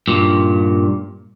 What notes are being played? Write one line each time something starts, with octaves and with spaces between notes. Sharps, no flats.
G2 A#2